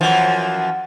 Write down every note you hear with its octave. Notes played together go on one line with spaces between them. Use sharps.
F#2 E3 F3